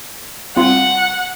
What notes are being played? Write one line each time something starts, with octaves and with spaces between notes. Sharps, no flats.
G3 C4 F4 F#5